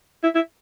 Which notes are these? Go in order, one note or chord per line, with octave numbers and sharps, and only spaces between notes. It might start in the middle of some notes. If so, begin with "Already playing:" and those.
E4
E4